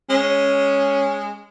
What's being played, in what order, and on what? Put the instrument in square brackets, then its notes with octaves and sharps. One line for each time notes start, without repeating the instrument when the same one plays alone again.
[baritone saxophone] G#3 [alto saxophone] C#4